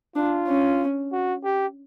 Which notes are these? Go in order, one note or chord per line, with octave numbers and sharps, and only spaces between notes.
D4 F4
C#4
F#4
G4